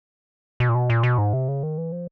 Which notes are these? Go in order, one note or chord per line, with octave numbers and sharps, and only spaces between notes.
B2
A#2
B2
A#2
B2
G#2
C3
C#3
D#3
E3
F3